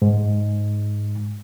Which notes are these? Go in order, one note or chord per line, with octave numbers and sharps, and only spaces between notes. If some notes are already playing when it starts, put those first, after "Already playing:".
G#2